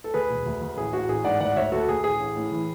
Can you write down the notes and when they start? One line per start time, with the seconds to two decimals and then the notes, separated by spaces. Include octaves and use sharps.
0.04 A4
0.14 D2 G#4 B4
0.30 E1
0.46 D2
0.61 D2
0.77 A1 G#4
0.93 A1 F#4
1.09 A1 G#4
1.24 G#2 D5 F#5
1.40 D2 D5 F#5
1.56 D2 C#5 E5
1.72 D2 F#4 A4
1.88 D2 G#4
2.04 A1 G#4
2.20 A1
2.35 A2
2.52 E3